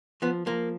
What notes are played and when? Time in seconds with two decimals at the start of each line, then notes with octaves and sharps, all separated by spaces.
0.22 F3 B3
0.46 F3 A#3